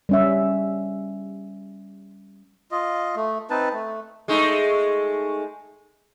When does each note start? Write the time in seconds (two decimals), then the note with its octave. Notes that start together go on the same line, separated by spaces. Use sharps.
0.09 G3 C#4 E5
2.71 F4 D#5
3.16 A3
3.50 C4 D#4 B4 A5
3.73 A3
4.28 G#3 A3 D#4